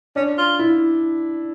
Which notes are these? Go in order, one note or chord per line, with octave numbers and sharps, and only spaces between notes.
C#4 D4
F4
E4